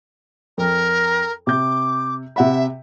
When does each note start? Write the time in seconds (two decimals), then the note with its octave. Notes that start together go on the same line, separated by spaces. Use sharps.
0.58 F2 A#4
1.47 C3 D6 G6
2.36 C3 E5 F#5 B5